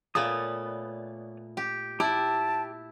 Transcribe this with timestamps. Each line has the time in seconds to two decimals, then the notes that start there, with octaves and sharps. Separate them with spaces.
0.15 A#2 A3 B3 C#5 D5 D#6
1.57 G4
2.00 E4 G4 G5 A5